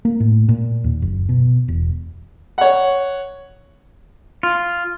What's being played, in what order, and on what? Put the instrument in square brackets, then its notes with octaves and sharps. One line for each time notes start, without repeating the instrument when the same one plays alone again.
[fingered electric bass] A#3
A2
A#2
D#2
F#1
B2
E1
[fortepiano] C#5 F#5
[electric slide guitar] F4